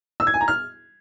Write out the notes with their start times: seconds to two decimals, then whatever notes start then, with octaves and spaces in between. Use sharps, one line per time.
0.20 E6
0.27 G#6
0.34 G#5
0.41 A#5
0.48 F6